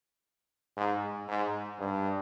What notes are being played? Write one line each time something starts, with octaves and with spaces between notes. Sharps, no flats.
G#2
G#2
G2